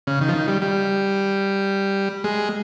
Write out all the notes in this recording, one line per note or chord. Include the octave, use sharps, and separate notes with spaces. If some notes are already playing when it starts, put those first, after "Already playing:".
C#3
D#3
F3
D#3
G3
G3
G#3